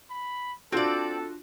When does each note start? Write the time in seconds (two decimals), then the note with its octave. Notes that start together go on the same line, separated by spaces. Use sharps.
0.10 B5
0.72 C4 D4 F4 F#4 A4 D5